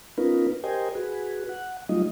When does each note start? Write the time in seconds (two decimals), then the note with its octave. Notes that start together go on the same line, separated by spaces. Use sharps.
0.18 B3 C#4 D#4 F4 A#4 B4
0.64 G4 A#4 C5 D#5 G5 G#5
0.95 F#4 G#4 B4
1.49 F#5
1.89 F#3 G3 A3 D#4 F4 D#5